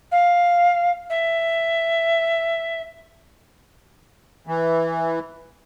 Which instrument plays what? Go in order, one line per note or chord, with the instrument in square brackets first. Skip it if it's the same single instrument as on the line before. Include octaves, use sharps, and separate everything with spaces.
[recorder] F5
E5
[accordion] E3